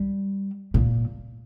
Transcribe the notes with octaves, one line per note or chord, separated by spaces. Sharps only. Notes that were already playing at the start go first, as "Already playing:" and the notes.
Already playing: G3
A#2